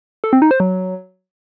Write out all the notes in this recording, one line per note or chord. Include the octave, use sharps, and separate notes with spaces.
A4
C4
D#4
C5
F#3